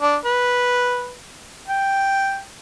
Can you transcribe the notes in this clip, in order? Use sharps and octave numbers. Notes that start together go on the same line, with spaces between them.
D4
B4
G5